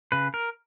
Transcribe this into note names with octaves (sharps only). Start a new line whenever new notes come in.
C#3 B4
A#4